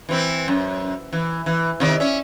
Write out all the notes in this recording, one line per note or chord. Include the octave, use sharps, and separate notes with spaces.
E3 C4 E4
F#2
E3
E3
C3 D#3 D5
C#4 E5